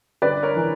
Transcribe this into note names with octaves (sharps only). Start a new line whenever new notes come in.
G1 B4 D5
A#4 C#5
E3